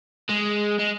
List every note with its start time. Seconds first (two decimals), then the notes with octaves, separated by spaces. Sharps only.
0.29 G#3
0.79 G#3